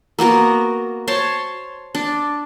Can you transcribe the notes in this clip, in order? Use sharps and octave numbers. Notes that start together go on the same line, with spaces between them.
A#3 B3 F#4 A#4
C5 C#5 A5 C6
D4